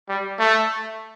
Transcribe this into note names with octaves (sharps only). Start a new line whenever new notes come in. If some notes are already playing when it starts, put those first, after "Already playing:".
G3
A3